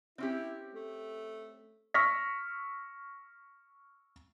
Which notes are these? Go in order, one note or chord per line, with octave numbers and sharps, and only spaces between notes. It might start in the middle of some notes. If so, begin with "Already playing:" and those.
C4 C#4 E4 G4
A3
C#6 E6 F6 A#6 B6